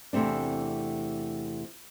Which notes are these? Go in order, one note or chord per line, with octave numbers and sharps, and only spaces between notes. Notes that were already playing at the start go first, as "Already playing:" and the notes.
E2 C3 A3 C4 D4